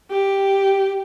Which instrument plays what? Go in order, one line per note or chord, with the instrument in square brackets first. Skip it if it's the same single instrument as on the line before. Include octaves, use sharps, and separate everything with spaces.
[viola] G4